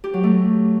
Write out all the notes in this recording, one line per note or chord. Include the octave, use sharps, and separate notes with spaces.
G4
F#3
A3